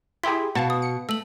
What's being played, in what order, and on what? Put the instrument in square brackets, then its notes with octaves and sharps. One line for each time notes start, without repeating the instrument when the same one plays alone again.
[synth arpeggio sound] E4 G4 G#4 [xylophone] G5 C6 B6
[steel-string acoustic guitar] B2 [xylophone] F5 F#5 [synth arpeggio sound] A5
[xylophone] D#6
[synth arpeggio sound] C#7
[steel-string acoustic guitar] A3 [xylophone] E6 F#7